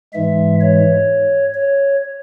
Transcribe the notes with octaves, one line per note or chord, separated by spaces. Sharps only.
G#2 E3 G#3 E5
C#5
C#5